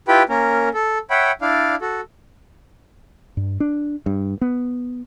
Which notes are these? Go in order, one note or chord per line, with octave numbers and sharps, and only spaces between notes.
E4 F4 G4 B4 G5 B5
A#3 C#4 A#4
A4
C#5 E5 F#5 G5 B5
D4 E4 D5 F5
F#4 A4
G2
D4
G2
B3